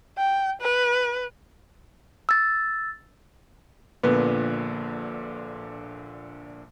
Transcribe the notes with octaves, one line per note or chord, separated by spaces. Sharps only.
G5
B4
E6 A6
A#1 A#2 D3 B3